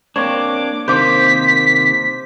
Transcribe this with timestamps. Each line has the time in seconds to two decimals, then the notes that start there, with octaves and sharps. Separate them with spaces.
0.16 A#3 C4 D4 C#5 D6
0.88 C3 D#3 A#3 C5 D6 B6